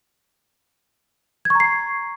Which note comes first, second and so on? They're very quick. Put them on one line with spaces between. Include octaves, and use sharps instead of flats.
G#6 C#6 A#5 C7